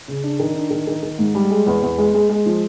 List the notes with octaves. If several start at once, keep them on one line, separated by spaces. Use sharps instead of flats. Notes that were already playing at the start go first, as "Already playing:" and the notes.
C#3
D4
D#3
D4
D#3
D#3
D#3
G#2
G3
G#3
E2
E2
G#3
G#3
G#3
F3